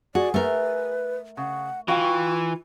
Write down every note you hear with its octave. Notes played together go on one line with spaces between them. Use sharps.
F#4 G#4 D5
A3 A#4 B4
C#3 F#5
E3 F4 F#4 F5 G5